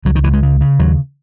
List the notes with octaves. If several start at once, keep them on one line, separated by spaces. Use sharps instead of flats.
C#2 F#3
D#3
C#2 E3
G#3
C#3
C#3
D#2 F#3